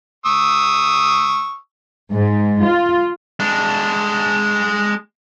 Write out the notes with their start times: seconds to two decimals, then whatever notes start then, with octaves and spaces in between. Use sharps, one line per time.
0.26 C#6 D#6 E6
2.13 G#2
2.64 F4
3.40 G#3 D4